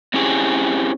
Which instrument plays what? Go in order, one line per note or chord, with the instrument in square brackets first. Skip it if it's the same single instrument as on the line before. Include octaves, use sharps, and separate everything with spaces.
[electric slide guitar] C4 C#4 E4 G4 G#4